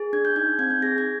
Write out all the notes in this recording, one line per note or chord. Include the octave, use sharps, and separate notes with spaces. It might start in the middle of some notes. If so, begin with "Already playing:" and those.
Already playing: G#4
D4 G#6
G6
D#4 G#6
C4 G#6
G6
G#4 A#6
G#6